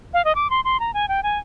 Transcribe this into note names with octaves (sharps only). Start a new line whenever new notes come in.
F5
D#5
D6
C6
C6
A#5
G#5
G5
G#5